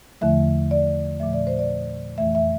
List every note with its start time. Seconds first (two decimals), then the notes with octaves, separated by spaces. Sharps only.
0.21 E2 D3 F3 A3 E5
0.71 D5
1.20 A#2 F3 A3 E5
1.33 D5
1.47 C5
1.59 D5
2.18 F2 E3 A3 E5
2.35 E5